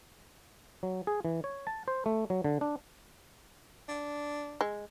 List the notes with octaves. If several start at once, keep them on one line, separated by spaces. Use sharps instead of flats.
F#3
G#4
E3
C#5
A5
C5
A3
F#3
D3
D4
D4
G#3